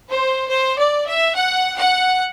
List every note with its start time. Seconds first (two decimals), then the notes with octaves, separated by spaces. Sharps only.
0.09 C5
0.50 C5
0.79 D5
1.07 E5
1.35 F#5
1.76 F#5